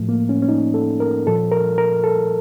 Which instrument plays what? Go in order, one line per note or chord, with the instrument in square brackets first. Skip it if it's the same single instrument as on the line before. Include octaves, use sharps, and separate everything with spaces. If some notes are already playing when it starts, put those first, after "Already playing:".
Already playing: [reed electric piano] A2 F3 A3
A#3
C#4
C#4
D#4
A4
A#4
A#2 F3 A4
A#4
A#4
A4